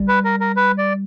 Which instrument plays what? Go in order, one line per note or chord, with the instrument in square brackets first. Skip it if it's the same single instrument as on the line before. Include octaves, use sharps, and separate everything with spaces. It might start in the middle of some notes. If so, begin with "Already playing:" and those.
Already playing: [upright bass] G3
[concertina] B4
A#4
A#4
B4
D5